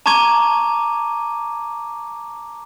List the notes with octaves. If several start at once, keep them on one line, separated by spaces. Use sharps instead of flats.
A5 A#5 C#6 D6 G#6 D#7